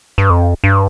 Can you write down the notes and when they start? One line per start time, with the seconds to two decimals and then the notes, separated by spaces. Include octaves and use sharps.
0.18 G2
0.30 F2
0.64 G2